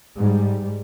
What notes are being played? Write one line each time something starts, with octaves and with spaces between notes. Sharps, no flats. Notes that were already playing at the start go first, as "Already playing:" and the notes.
G#2 G3